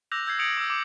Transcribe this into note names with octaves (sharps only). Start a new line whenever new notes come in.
D6 E6 F#6 G6 A#6 F7
E6 G6 G#6 C7
D#6 G#6 C#7 D7 F7 F#7
D6 E6
D6